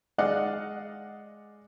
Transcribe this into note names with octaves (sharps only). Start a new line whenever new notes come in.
G#3 D5 D#5 F5 F#5